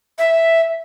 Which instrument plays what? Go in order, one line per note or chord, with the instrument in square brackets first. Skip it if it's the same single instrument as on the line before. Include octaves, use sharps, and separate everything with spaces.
[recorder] E5